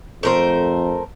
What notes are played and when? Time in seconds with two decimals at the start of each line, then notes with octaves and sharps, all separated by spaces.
0.23 F2 A3 A#4 C5